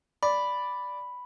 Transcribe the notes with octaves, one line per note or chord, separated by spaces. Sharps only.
D5 B5